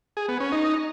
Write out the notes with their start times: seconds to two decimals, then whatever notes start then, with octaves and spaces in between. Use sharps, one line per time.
0.17 G#4
0.28 B3
0.40 C#4
0.52 D#4